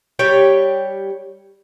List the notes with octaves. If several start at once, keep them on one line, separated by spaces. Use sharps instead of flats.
G3 G4 C#5 G5